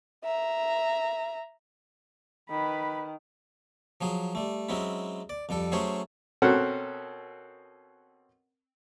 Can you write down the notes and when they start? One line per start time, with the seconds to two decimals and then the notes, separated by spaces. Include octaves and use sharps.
0.24 E5 A#5
2.50 D#3 B4 B5
4.01 F3 F#3 G#4
4.35 G3 A3
4.69 F#3 G#3 C4 C#4 E4
5.30 D5
5.49 F2 G3 A4
5.72 F#3 A3 C#4 G#4 C5 C#5
6.42 B2 C4 C#4 A4 A#4 F#5